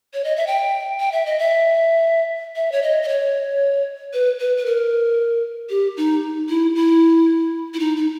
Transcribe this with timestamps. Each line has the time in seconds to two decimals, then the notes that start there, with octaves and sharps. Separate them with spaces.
0.14 C#5
0.24 D#5
0.36 E5
0.47 G5
1.00 G5
1.12 E5
1.26 D#5
1.39 E5
2.56 E5
2.72 C#5
2.83 D#5
3.03 D#5
3.09 C#5
4.13 B4
4.39 B4
4.57 B4
4.66 A#4
5.70 G4
5.97 D#4
6.49 E4
6.75 E4
7.74 E4
7.80 D#4
7.97 D#4